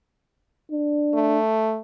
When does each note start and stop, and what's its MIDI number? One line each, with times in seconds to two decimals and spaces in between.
0.72 1.38 62
1.14 1.79 57